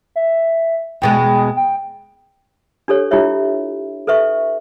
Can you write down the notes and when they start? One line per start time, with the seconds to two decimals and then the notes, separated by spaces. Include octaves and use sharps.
0.16 E5
1.02 E2 B2 G#3 G5
1.56 G5
2.88 D4 G4 A4 C#5
3.11 D4 E4 F4 G4 C#5 E5
4.07 A4 B4 E5 C#6